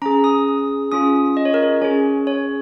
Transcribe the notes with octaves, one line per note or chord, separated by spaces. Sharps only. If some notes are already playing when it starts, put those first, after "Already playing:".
C#4 G#4 A#5
D#6
C#4 F4 G#4 D#6
D#5
C#5
A#4
C#5
C#4 G#4 C#5
C#5